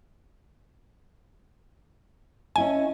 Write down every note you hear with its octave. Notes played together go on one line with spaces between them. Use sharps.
C#4 E4 D#5 G#5